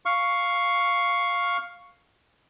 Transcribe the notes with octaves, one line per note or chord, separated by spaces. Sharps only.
F5 C#6